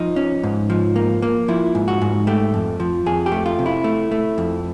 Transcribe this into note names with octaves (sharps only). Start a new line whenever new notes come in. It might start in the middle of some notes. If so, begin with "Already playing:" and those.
Already playing: F3 D#4
C#4
G#2
F3
A#3
A#3
F3 E4
G#2
F#4
G#2
A3 G4
F2
F3
F2 G#4
G4
A3
F4
C3
E4
A3
A3
F2